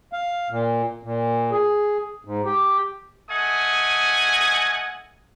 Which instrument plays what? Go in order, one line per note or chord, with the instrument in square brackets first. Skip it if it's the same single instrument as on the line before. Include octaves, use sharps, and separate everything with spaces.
[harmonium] F5
A#2
A#2
G#4
G#2
G4
[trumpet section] A3 D#5 F#5 G#5 D#6